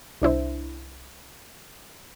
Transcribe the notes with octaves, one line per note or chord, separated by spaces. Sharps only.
C2 D4 E4 C5